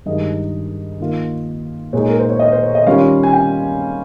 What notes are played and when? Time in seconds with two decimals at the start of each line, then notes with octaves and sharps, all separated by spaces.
0.06 G2 D#3 G#3 D#4 D#5
1.00 D#3 A#3 F4
1.93 A#2 G#3 D#4 C#5
2.08 A#4
2.19 C5
2.30 C#5
2.39 D#5
2.52 C5
2.63 C#5
2.75 D#5
2.86 D#3 G3 C#4 F4 F5
3.23 G#5
3.33 G5